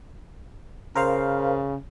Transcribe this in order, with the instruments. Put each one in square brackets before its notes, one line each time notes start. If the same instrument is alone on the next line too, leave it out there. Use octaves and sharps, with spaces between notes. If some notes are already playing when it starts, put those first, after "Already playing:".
[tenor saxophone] C#3 [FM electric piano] A#4 C5 F5